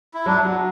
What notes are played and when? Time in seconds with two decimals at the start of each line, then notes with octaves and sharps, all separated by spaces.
0.14 E4
0.26 F#3 D4
0.45 F#4